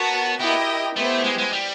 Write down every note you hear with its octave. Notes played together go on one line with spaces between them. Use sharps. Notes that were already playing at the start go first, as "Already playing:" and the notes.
Already playing: B3 F#4 A#4 C#5 F#5 A5
B3 E4 G4 A#4 D#5 G5
A3 B3 E4 G4 C5
G#3
G#3
G3